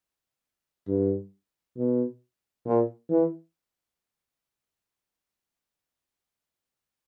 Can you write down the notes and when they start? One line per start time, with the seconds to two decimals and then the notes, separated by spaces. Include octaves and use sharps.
0.88 G2
1.77 B2
2.65 A#2
3.10 E3